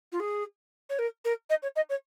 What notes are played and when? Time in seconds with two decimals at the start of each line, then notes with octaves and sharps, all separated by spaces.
0.12 F4
0.20 G#4
0.90 C#5
0.99 A#4
1.25 A#4
1.50 D#5
1.63 C#5
1.76 D#5
1.90 C#5